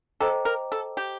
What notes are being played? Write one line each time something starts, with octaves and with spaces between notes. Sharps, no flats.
A4 C5 D#5 G5 A#5 D6
A#4
A4
G4